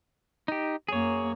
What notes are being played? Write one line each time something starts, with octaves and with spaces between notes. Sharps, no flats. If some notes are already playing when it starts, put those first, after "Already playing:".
D#4 G4
F#2 A#3 G#4 C#5